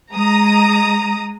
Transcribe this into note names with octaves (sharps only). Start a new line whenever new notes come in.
G#3 A#5 D#6